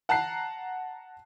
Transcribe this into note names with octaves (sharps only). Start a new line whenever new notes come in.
F#5 A5 A#5 F#6 C7